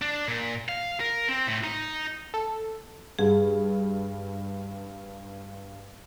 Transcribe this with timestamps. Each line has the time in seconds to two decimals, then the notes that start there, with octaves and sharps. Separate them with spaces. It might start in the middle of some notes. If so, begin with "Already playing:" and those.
0.02 D4
0.28 A#2
0.69 F5
1.00 A#4
1.29 C4
1.47 A2
1.64 D#4
2.34 A4
3.19 G2 G#4